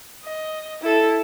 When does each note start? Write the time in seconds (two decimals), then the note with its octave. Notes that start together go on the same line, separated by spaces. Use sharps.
0.24 D#5
0.82 E4 A4